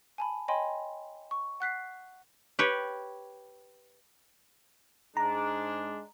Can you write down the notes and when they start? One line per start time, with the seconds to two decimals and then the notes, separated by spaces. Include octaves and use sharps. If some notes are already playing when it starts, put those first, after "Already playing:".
0.18 G#5 A5 B5
0.48 C#5 D#5 G5 G#5 B5 C6
1.31 C#6
1.60 F#5 F#6 B6 C7
2.59 G4 B4 C#5
5.17 G#2 G#3 D4 A#5